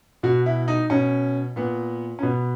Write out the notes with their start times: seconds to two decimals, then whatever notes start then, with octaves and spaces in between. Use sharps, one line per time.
0.23 B2 F#4
0.46 E4
0.68 D#4
0.90 B2 C#4
1.56 A#2 B3
2.19 C#4
2.23 B2 B3